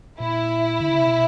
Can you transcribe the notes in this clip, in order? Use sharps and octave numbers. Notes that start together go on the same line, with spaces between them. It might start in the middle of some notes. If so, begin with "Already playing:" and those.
A#2 E4
D3
C#3
C3
B2